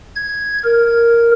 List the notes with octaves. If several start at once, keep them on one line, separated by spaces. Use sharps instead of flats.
G#6
A#4